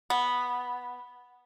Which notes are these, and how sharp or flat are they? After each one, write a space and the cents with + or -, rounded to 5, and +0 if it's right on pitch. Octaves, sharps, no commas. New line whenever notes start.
B3 -5